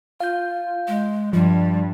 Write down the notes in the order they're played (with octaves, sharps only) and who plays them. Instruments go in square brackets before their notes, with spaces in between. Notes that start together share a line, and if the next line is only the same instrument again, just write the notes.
[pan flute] F4 [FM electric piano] F5 G6
[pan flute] G#3
[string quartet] G2 [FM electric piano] F3 [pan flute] G3